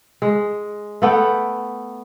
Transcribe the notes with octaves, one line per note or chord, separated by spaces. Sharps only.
G#3
A3 B3 G5